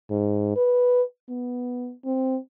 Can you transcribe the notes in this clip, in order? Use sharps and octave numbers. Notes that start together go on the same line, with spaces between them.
G#2
B4
B3
C4